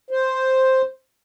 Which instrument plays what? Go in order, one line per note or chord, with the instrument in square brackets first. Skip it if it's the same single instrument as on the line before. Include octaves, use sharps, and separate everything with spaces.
[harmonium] C5